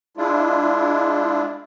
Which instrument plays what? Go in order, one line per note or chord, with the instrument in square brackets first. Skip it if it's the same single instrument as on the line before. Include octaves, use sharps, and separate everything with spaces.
[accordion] G#3 D4 E4 F4